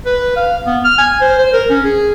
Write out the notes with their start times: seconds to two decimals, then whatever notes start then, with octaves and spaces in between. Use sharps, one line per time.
0.06 B4
0.36 F5
0.67 B3
0.84 F6
0.98 G#5
1.21 C5
1.39 C5
1.53 A#4
1.70 C#4
1.84 G#4